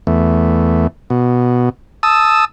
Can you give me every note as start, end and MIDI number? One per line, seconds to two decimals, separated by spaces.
0.07 0.87 40
0.07 0.87 57
1.10 1.69 47
2.03 2.45 81
2.03 2.45 87
2.03 2.45 88